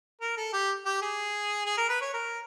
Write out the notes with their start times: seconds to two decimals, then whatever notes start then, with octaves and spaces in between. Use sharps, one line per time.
0.21 A#4
0.37 A4
0.53 G4
0.85 G4
1.02 G#4
1.66 G#4
1.77 A#4
1.89 B4
2.01 C#5
2.14 A#4